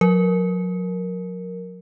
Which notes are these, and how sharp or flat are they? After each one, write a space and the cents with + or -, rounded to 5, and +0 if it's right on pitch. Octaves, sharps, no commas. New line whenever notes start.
F#3 -40 A#4 +0